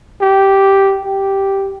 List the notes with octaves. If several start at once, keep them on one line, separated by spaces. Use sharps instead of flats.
G4
G4